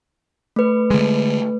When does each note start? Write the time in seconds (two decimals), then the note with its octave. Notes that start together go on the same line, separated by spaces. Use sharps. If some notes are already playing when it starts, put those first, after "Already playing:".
0.56 A3 B4
0.91 D3 G#3